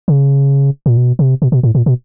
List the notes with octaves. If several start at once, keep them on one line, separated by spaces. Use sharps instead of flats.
C#3
A#2
B2
C3
B2
B2
A2
A#2
B2